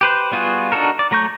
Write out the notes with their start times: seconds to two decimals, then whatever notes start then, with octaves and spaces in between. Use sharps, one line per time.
0.01 G4 B4 C5
0.31 G3 B3 F4 F#4 G#4
0.72 D4 D#4 F#4 A4 A#4
0.99 D5
1.11 F#3 A3 A#5 C#6 G6